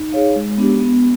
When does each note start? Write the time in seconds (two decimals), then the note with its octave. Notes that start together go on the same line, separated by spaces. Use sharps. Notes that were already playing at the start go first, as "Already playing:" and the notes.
Already playing: D#4
0.12 G#4 C#5 F5
0.36 G#3
0.58 B3 D4 G4
0.80 B3